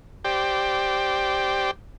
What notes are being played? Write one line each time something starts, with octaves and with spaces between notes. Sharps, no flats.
G4 C5 D5 G5